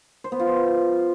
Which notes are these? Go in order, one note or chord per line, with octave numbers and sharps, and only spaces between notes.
C5
B3
F4
C5